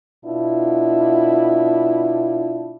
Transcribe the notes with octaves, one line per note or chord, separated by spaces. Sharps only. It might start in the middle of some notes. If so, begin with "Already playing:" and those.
B2 D4 E4 F4